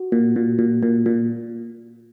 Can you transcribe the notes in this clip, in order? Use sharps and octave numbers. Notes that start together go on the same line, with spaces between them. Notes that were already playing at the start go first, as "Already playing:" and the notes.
Already playing: F#4
A#2
A#2
A#2
A#2
A#2